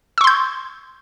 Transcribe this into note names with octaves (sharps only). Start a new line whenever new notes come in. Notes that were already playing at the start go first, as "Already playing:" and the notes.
C6 C#6 E6 G6